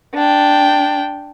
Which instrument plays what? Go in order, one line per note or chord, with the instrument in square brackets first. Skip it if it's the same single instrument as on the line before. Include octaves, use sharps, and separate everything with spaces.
[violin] D4 G5